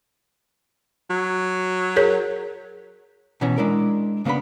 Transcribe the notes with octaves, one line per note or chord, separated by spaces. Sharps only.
F#3
G#4 A#4 C#5
B2 E3 C#4 G#5 A#5
G#3 D4 E4 A#4
C#3 A#3 B3 D4 B5